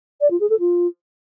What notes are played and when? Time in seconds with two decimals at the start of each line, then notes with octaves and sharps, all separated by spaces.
0.21 D5
0.30 F4
0.40 G#4
0.50 A4
0.59 F4